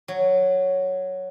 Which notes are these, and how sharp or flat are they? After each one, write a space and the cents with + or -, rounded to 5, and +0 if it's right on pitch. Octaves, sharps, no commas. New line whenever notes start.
F#3 +0